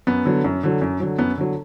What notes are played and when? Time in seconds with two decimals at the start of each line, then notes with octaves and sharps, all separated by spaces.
0.07 F#2 B3
0.25 D3 F#3
0.44 F#2
0.63 D3 F#3
0.82 F#2
1.00 D3 F#3
1.18 F#2 B3
1.37 D3 F#3